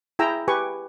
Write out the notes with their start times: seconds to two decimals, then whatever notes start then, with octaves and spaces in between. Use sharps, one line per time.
0.19 E4 G#4 G5 A#5 E6
0.48 G4 B4 G#5 C#6